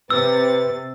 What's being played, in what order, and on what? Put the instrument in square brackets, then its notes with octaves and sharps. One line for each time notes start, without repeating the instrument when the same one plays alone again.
[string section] C3 A6 [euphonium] B4 [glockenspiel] E6